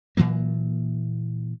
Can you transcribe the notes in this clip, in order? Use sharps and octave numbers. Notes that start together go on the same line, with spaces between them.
A#2 E3 F#3 A#3